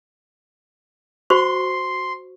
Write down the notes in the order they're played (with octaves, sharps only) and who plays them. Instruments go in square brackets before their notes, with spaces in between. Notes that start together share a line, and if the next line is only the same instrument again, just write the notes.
[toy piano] F#4 C5 C#6 [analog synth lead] C6